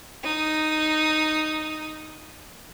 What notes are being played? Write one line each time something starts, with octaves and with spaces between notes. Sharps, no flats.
D#4 D#6